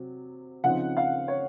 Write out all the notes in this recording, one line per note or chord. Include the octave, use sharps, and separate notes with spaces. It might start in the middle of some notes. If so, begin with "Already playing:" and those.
Already playing: C3 F#3
C#3 F3 C4 D#4 F#5
F5
C#5